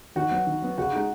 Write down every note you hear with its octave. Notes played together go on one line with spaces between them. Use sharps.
D#3 F#4
F#3 B3
D#3
F#3 B3
C#3 F#4
G#3 D#4